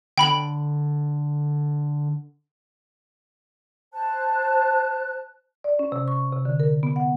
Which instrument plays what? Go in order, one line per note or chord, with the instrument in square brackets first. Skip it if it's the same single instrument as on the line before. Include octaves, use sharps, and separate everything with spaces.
[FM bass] D3 [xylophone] G5 B5 F#7
[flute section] C5 A5 F#6
[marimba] D5
C#4
C3
C#6
C3
D3
A#4
B3
F#5